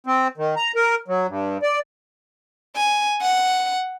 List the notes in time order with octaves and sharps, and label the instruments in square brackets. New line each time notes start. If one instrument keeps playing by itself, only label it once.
[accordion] C4
D#3
A#5
A#4
F#3
G2
D5
[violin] G#5
F#5